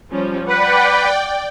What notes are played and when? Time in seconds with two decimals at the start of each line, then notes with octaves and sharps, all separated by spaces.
0.11 F3 G3 C#4
0.48 B4 D5 F#5 G5